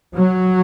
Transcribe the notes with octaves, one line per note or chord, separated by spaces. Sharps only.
F#3